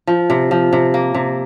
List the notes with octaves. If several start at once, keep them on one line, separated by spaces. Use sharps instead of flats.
F3
C3
F3
C3
A#3
C3